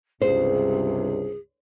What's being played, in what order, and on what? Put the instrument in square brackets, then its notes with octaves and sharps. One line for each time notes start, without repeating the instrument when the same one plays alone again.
[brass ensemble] C#2 G2 C3 [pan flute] G#4 [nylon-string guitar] C5